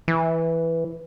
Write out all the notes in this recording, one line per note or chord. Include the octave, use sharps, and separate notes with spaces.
E3